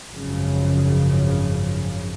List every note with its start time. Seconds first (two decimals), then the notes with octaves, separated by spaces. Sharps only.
0.10 G#1 F#2 C#3 F3